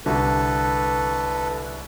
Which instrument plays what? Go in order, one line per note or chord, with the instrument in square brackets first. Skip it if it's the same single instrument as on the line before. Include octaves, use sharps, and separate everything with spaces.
[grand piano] C2 D3 [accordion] A4 B4